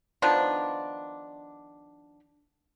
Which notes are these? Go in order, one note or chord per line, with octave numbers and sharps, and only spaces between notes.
D#3 F3 B3 D4